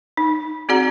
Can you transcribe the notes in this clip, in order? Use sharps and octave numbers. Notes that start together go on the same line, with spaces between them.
D#4
C4 F#4 G#4 D5 F#5 A#5